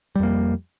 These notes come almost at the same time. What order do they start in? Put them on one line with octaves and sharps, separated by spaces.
G3 F2 A#3